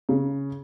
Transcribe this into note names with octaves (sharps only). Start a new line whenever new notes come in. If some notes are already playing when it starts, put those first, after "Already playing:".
C#3